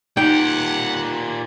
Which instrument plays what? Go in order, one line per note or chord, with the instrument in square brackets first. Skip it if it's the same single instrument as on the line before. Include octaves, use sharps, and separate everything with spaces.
[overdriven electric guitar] A#2 G4 [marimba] D#4 [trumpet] F#5 [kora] G5